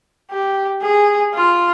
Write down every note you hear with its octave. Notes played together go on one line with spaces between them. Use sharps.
G4
G#4
F4